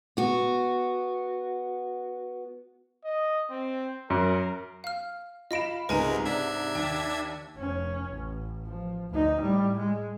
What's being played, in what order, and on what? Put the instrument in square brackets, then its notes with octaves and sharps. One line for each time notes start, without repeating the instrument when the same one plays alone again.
[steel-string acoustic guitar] B3 F#4
[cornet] D#5
C4
[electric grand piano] F#2 [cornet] A#4
[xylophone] F5 F6
[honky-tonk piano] F4 B5 E7 [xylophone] D#5 A#6 D7
[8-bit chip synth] C#2 G#3 A#4 [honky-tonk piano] G#2 C3 A#5 [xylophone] B4 G#5
[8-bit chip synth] D4 E5 G#6
[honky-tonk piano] D#2 [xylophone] G5
[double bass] F1 C#4
A1
F3
D2 D#4
A2 G3
G#3